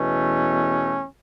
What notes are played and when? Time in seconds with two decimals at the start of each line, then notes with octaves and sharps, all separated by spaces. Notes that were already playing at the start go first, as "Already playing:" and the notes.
Already playing: E2 B2 A3 C#4